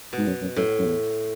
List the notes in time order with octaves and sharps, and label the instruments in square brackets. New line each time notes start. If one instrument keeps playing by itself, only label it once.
[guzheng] B2
[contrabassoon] G#2
F#2
F#2
[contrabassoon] F#2 [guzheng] A2
[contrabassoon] F#2
E2